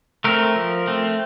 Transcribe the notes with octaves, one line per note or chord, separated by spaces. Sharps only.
A3 C4 A#4
F3
A3 C4